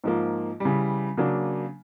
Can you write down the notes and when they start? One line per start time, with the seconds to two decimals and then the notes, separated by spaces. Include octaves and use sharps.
0.04 G#2 F3 A#3
0.60 C#3 E3 G3
1.17 C#3 F#3 A#3 D4